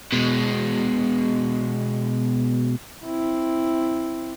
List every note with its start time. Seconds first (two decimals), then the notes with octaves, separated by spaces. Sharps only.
0.12 B2 G#3
3.05 C4 E4